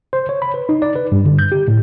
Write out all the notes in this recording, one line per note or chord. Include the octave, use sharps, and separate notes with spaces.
C5
C#5
B5
B4
D#4
D5
B4
G2
D3
G6
G4
A2